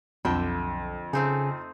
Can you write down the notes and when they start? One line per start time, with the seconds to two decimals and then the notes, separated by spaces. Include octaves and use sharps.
0.25 B1 F2 D3 E5 G5
1.13 C#3 A3 C4 D#4 G#5